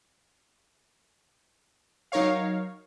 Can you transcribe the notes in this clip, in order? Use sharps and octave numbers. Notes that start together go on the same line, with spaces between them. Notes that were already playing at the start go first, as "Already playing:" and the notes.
F#3 D#4 A#4 C#5 F5